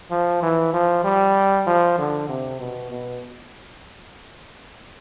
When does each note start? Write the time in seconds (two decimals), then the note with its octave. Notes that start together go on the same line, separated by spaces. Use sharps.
0.11 F3
0.43 E3
0.73 F3
1.04 G3
1.67 F3
1.98 D3
2.29 C3
2.60 B2
2.91 B2